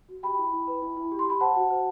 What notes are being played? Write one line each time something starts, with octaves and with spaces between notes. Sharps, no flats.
F#4
G4 G5 B5
E4
E4
B4
E4
E4
G4
C6
G4 B5
C5 F#5 A5
F#4
C5